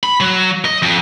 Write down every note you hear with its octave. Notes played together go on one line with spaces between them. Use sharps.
B5
F#3
D#5
F2